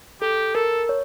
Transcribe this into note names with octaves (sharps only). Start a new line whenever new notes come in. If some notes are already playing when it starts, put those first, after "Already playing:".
G4 A4
A4 A#4
C#5